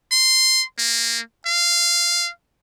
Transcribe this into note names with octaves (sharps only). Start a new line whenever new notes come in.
C6
A#3
F5